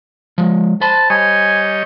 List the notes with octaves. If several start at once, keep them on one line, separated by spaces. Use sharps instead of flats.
F3 G#3
C5 A5 B5 C6
G3 C#5 D#5 G#5